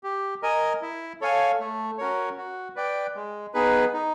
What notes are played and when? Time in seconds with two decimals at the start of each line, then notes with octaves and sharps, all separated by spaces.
0.03 G4
0.42 A#4 D#5 G#5
0.82 E4
1.21 A4 C#5 F5 G#5
1.60 A3
1.98 C#4 F#4 A#4 C#5
2.37 F#4
2.75 B4 D5 G5
3.15 G#3
3.54 B3 D#4 G#4 B4
3.93 D#4